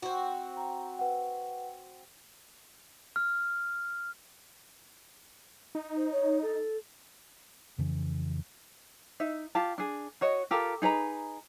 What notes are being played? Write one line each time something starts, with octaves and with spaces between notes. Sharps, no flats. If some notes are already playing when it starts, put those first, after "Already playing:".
C4 F#4
A#5
B4 F#5
F6
D#4
C5
C#5
A4
F2 C#3 E3
D#4 E5
F4 G4 A5
D4 G#4
F#4 C#5 D#5
F4 G4 A4 A#4
D#4 G#4 B4 A#5